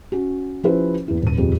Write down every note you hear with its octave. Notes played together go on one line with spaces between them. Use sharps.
C#4 F#4
F3 C#4 E4 G4 B4 C5
E2 E4
D#1 D#7
D#1 F2 G4 G#4